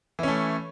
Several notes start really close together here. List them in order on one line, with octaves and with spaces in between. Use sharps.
E3 C#4 A3